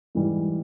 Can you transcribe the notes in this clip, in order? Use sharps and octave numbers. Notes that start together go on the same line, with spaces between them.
G#2 E3 G3